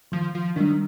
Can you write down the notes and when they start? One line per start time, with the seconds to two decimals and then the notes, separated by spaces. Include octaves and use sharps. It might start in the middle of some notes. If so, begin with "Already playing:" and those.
0.12 D#3 F3
0.35 F3
0.56 D#3 G3 D4